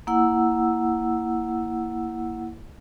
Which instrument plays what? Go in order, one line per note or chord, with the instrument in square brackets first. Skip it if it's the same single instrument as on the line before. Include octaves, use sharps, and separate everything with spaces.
[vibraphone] A#3 E4 F#5 E6